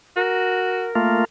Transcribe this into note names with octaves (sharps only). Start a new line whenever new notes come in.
F#4 A#4
A3 A#3 F4